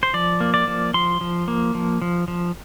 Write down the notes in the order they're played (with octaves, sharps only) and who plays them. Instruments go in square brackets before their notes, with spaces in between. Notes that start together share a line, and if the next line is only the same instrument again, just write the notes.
[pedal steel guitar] C5
F3 D5
A#3
D5
F3
F3 C6
F3
A#3
F3
F3
F3